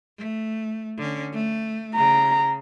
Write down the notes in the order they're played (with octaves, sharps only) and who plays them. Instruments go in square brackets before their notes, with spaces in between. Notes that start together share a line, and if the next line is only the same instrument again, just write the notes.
[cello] A3
D3 C#4
A3
[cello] C#3 [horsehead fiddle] A#5